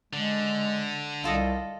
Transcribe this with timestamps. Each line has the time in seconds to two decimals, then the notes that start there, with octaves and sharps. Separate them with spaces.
0.13 D3 G#3
1.24 C2 F4 A4 D#5